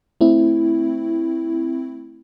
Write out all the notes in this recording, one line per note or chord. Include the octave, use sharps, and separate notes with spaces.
A3 C4 E4